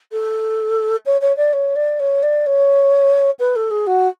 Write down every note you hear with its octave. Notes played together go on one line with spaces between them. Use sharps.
A4
C#5
C#5
D5
C#5
D5
C#5
D5
C#5
B4
A4
G#4
F#4